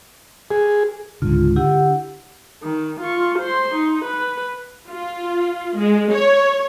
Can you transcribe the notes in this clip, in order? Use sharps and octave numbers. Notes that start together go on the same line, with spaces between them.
G#4
C#2 G#2 D3 F4
D3 E4 G4 F#5
D#3
F4 C#6
C5 C6
D#4
B4
F4
G#3
C#5